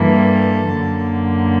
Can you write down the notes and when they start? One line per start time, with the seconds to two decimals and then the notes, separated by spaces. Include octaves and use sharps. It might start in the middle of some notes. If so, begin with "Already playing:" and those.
Already playing: G2 E3 G3 A#3 A4
0.68 F#2 D3 F#3 A#3